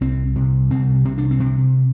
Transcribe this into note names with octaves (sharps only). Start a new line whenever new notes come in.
C2 C4
C3
C2 C4
C3 C4
D4
C4
C3